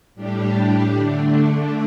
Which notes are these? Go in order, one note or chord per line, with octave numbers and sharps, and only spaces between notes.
A2 G3 D4 G4
D3 A3 D4